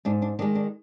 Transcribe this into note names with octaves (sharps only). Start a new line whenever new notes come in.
G#2 D4
D4
D#3 G#3 D4
D4